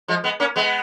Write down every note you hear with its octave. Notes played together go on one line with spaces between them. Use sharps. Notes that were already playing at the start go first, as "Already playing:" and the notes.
F3 G#3
G#3 B3
A#3 C#4
G#3 B3